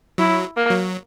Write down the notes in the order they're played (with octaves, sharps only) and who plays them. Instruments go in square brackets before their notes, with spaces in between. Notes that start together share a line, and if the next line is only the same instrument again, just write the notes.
[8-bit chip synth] F#3 [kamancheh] E4
[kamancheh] A#3
[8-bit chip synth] F#3